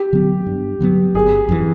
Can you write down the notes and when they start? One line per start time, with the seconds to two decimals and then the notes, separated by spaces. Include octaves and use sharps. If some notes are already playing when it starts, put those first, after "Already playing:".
Already playing: G4
0.13 D3 F#3 B3
0.46 G2
0.80 D3 F#3 B3
1.14 G1 G#4
1.49 F2 C#3 E3